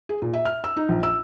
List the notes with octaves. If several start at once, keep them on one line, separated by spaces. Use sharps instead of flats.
G#4
A#2
E5
F6
E6
D#4
A#1
E6